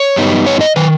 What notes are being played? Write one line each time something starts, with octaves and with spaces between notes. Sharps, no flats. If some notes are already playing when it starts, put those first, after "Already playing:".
Already playing: C#5
G2 G3 B3 D#4
C#5
D#5
D#3 B4